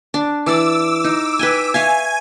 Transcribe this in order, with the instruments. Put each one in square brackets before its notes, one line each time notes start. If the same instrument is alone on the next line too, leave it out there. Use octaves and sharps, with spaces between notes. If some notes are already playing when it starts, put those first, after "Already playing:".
[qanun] D4
[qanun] E3 D5 [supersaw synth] D6 E6
[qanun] D#4
B4 G5 G#5
[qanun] C#5 E5 F5 [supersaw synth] G#5